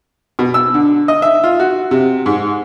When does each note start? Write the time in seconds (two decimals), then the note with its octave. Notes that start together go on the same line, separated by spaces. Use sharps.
0.39 B2
0.54 E6
0.74 D3
1.08 D#5
1.22 E5
1.44 F4
1.60 F#4
1.91 C3
2.26 G#2